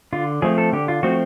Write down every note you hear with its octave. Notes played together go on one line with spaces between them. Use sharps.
D3 F4
F3 A3 C4 G#4
A4
D3 G4
F4
F3 A3 C4 F#4